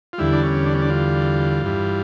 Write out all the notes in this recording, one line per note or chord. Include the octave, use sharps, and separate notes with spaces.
F4
E2 D3 G3 E4
D4
C#4
D4
C#4
D4
F4
G2 E3 G3